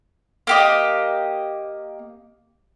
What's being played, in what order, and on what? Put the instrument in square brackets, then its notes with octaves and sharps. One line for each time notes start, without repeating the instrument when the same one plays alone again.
[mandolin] A#3 G4 D#5